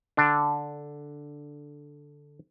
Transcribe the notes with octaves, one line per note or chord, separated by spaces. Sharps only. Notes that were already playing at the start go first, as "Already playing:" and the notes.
D3 D4